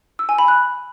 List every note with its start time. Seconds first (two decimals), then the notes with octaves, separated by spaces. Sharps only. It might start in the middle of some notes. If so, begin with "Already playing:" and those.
0.19 E6
0.29 G#5
0.39 B5
0.48 F#6